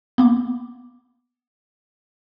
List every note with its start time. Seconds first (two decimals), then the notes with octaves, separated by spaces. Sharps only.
0.18 A#3 B3 D6